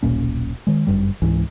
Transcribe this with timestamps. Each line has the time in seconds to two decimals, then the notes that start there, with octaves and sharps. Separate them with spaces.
0.03 D#1 B1 A#2 C#4
0.67 D#3 G#3
0.87 G1 F#2 G3
1.22 C#2 G#2 E3